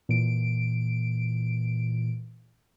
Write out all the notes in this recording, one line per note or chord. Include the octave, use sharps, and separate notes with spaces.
A#2 E3 D7